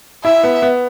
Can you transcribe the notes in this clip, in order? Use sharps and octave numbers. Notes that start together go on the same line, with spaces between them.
E4 E5
B3
B3